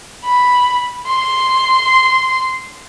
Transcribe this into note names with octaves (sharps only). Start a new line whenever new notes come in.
B5
C6